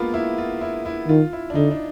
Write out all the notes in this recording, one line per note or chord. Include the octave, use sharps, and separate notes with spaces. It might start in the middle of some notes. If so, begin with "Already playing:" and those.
Already playing: G#3 A#3 B3 F4
E4
F4
E4
E4
D#3 F4
E4
D4
D3 D#4
D4